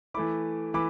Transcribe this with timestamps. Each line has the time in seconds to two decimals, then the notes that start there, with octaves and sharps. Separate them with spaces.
0.14 E3 A3 E4 B5 D6
0.74 E3 B5 D6